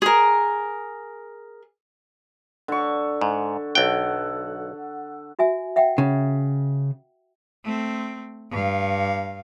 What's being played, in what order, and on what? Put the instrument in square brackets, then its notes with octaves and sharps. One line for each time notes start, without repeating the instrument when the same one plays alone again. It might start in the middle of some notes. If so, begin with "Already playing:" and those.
[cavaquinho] G#4 A#4
[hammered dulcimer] D3 C#6
[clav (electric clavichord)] G#2
[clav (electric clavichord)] B1 G5 [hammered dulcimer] A4 F#5
[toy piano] F#4 E5 G#5
E5 F#5 G5
[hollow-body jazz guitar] C#3
[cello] A3 C4
G2 F5